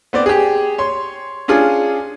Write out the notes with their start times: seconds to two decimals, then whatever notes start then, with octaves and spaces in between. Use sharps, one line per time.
0.13 B3 C4 D5
0.26 G4 G#4
0.78 C#5 C6
1.48 C#4 D4 F4 G#4